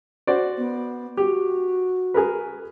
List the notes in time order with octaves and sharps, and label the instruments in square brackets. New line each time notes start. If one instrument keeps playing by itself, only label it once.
[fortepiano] F#4 C5 D5
[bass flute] B3
[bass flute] F#4 [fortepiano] G4
[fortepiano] G#4 A#4 B4